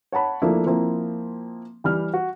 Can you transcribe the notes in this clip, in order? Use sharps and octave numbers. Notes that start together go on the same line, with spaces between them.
C#5 F#5 A5 B5
F3 A3 A#3 D4 E4
F3 A#3 C4 E4
E3 G3 F6
F#4